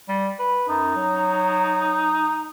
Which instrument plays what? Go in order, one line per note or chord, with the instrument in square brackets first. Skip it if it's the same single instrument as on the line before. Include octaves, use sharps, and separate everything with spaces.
[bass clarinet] G3
B4
[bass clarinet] F#2 [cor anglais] D#4
[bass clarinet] F#3